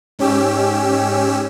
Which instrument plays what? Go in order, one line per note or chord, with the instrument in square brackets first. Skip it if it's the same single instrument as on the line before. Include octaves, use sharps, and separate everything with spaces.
[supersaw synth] G#2 C#4 G4 E6